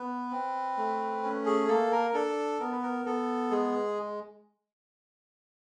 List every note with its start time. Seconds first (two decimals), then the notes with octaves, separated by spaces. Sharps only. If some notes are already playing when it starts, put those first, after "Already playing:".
Already playing: B3 B4
0.31 C4
0.77 A3
1.23 C#4
1.46 G#4
1.68 A#3 A4
1.92 A#4
2.14 D4 A4
2.60 B3 A#4
2.72 B4
2.83 A#4
3.05 B3 A4
3.50 G#3 G#4